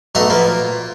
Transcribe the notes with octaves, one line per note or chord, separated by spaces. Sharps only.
B1 A3 D#5 F#5 A#5 C6
F3 A#3 B3
A#2